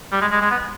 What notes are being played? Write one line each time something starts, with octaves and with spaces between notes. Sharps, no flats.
G3
G#3
G#3
G#3
B3